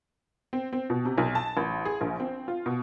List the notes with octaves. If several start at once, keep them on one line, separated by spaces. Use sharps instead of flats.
C4
C4
B2
C3
B1
A5
A1
G#4
A#1
C4
F4
B2